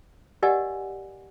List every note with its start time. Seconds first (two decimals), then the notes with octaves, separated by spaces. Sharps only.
0.43 G4 A#4 D5 D#5 F#5 G#5